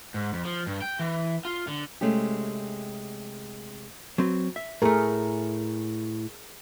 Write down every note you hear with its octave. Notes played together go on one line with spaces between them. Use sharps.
G#2
F2
F3
G2
G5
E3
F4
D3
C3 G#3 A3 C#4 G4
F#3 C4 B4
E5
A2 A3 G#4 A#4